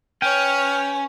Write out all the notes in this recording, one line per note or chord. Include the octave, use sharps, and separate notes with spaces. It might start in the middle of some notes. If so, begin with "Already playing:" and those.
C#4 B4 C#5 G5 F6